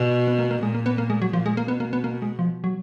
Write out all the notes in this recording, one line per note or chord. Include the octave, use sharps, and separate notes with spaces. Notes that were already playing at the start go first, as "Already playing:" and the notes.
Already playing: B2
B3
A#3
A#3
A#2 G#3
A#3
B3
A#3
G#3
F#3
A#2 F3
G#3
A#3
B2 B3
A#3
B3
A#3
G#3
F3
F#3